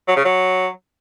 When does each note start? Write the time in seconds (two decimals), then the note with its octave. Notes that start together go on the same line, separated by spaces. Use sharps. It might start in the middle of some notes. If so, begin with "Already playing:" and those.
0.08 F#3
0.16 C#3
0.25 F#3